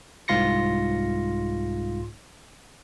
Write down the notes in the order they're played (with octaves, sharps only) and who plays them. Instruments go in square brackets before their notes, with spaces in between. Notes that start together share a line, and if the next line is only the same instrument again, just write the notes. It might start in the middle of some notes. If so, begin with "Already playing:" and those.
[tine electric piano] C2 G#2 F4 C6 A#6 C#7